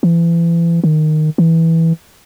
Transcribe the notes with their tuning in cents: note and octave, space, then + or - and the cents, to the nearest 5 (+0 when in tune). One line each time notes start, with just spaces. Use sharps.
E3 +35
D#3 -10
E3 -10